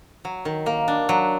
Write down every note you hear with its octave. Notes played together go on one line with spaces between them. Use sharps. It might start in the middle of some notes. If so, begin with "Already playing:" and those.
F#3
D#3
A#3
D4
F#3